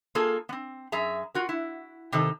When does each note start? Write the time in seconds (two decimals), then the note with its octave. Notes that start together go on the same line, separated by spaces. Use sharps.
0.15 A#3 F4 G#4 A4
0.49 B3 C4
0.92 F#2 G#4 E5 A#5
1.34 F4 F#4 A#4
1.49 E4
2.12 C3 D#3 D#4 A4